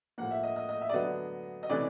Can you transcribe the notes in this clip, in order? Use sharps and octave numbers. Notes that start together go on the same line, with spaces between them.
A2 F3 A#3 F#5
E5
D#5
D#5
D#5
E5
D5
D3 F#3 B3 D4 D#5
D#5
C3 E3 A3 C#4 D5